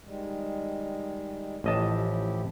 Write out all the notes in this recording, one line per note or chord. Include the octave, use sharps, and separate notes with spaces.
D#3 G3 G#3
A1 F3 E4 G4 D#5 A5